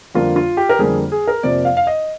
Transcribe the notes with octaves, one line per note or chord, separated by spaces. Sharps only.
F2 D3 G3 A#3 F4
F4
G4
A#4
F2 D3 G3 A#3 G#4
G#4
A#4
F2 C3 F3 A#3 D5
F5
F5
D#5